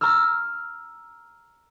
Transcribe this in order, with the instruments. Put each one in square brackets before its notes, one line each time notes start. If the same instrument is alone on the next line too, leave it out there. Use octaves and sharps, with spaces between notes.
[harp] A#5 C#6 E6 F6